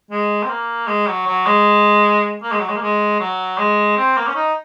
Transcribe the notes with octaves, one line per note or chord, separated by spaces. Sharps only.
G#3
C4
A#3
G#3
F#3
F#3
G#3
A#3
G#3
F#3
G#3
A#3
G#3
F#3
G#3
C4
A#3
C#4
D#4